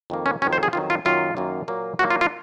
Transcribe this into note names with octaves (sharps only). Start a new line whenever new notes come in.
F2 D#3 A#3
C#4
F2 D#3 F#3 C#4
C5
G#4
F2 D#3 F#3 F4
F4
F#2 D#3 F#3 A#3 F4
F#2 D#3 F#3 A#3
A#2 F#3 A#3
A#2 F#3 A#3 F#4
F4
F4